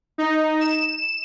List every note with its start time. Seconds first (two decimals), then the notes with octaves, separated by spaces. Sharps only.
0.18 D#4
0.61 E7